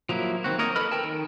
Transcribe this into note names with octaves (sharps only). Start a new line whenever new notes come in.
F3 F#3 A#3 E4
D#3 C4 F#4
A#3 A#4 C#5 D#5
A4 B4 D#5 B5 F6
A#4 G5 A5
D#3